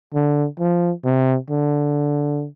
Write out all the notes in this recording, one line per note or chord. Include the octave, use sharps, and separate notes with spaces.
D3
F3
C3
D3